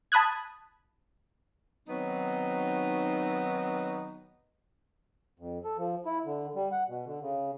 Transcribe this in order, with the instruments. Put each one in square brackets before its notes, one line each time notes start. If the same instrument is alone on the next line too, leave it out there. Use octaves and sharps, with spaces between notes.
[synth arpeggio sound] A5 B5 D#6 F#6 G#6
[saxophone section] D#3 F#3 B3 C4 D#4
[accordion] F2
A4
F3
E4
D3
G3
F#5
B2
D3
C#3